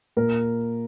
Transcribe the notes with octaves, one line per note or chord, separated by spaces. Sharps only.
A#2 A#4